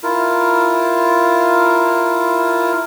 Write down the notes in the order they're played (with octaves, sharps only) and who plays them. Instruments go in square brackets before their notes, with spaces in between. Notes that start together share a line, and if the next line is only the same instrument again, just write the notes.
[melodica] E4 F4 A#4